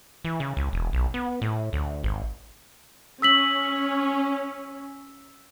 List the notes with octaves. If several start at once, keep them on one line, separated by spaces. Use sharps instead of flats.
E3
C#3
C#2
E1
B1
B3
A2
D2
G#1
C#4 E6 B6 F#7